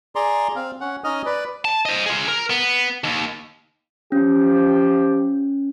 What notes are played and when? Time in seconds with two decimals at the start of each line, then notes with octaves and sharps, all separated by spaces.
0.16 G#4 D5 A#5 C6
0.56 C4 F5
0.81 C#4 F#5
1.04 C#4 D#4 D#5 D#6 F6
1.26 B4 D5
1.65 A5
1.86 C5 D#5
2.06 F4 G#4
2.28 A#4
2.50 B3
3.04 D#2
4.12 F3 C#4 G4